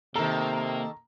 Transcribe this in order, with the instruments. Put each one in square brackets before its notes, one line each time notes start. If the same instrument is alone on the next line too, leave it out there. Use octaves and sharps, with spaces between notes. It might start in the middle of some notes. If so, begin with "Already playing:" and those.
[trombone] C3 [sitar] D#3 A4 [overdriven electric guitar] A#3 [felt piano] A#5